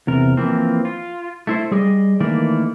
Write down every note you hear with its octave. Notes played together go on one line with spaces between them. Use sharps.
E2 C3 A#4
E3 F3 A#3 C4
F4
A3 E4 C5
G3 G#4 D5 D#5
D#3 E3 A3 A#3 D5